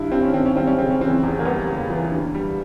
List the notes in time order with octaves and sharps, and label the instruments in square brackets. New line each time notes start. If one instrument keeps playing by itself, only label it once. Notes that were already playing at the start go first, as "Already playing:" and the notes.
Already playing: [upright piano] G2 D#3 G3 E4
G2 C4
C#4
D#3 C4
C#4
G3 C4
C#4
C#3 C4
C#4
E3 C4
E2
A#3
G3 B3
C#3
E3
D3
G3